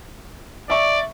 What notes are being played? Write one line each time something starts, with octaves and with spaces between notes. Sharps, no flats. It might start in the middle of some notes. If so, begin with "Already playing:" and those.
D5 E5 C#6